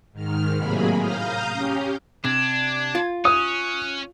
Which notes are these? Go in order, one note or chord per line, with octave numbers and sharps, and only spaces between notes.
G#2 D#3 F6
A2 C3 F#3 A#3 G#4 B5
F5 A#5 D#6 F6 G6
C#4 G4
C3 D4 G#6
F4
C#4 D#6 F#6